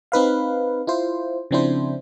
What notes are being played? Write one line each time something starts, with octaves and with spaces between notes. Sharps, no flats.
C4 D#4 B4 F5
E4 F4 C5
C#3 F3 C4 D4 E4 C5